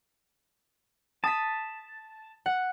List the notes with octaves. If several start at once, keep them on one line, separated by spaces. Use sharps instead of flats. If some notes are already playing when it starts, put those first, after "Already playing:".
A5 D#6 B6
F#5